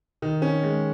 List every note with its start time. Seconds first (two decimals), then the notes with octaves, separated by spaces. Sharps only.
0.22 D#3
0.42 C#4
0.63 G#3